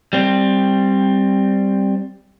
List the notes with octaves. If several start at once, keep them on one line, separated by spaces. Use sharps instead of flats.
G3 C4